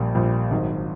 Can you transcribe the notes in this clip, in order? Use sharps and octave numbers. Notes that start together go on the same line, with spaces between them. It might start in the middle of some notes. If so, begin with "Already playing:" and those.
Already playing: A#1 A#2 G3
A#1 A#2 G3
G#1 G#2 D#3 F#3